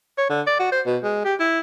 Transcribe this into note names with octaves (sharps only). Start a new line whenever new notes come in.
C#5
D3
D5
F#4
C5
B2
G#3
G4
E4